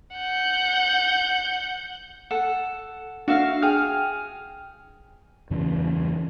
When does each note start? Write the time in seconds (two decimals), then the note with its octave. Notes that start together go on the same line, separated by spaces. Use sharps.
0.16 F#5 G6
2.31 A4 F#5
3.28 D4 F#4 E5 F5
3.62 G#4 G5 F6
5.50 E2 G2 C#3 E3